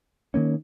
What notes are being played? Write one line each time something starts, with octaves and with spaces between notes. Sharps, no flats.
D#3 A#3 C#4